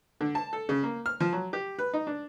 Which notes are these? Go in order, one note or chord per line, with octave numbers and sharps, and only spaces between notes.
D3
A5
A4
C#3
A#3
F6
F3
F#3
G4
B4
D#4
D4